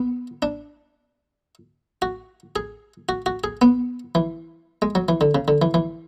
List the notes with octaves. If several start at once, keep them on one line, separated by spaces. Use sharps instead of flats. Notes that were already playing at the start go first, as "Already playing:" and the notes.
Already playing: B3
D4
F#4
G#4
F#4
F#4
G#4
B3
E3
G#3
F#3
E3
D3
C#3
D3
E3
E3